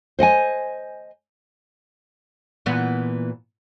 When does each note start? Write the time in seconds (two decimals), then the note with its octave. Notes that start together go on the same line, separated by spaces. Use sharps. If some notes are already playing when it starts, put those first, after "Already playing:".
0.19 C5 D#5 F#5 G#5
2.66 A#2 E3 B3